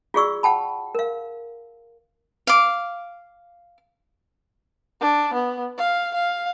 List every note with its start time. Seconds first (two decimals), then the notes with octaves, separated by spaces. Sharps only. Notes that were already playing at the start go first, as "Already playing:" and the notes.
0.14 F4 F#4 G#4 D5 C#6 E6
0.43 F#5 G5 A5 B5
0.95 A#4 F5
2.47 F5 D6
5.01 D4
5.34 B3
5.77 F5
6.14 F5